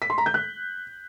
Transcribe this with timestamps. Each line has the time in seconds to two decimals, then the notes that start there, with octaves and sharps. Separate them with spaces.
0.02 B6
0.10 C6
0.18 A#5
0.26 G6
0.34 F#6